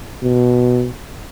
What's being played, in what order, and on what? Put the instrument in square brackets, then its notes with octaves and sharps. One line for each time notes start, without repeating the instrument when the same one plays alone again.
[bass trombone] B2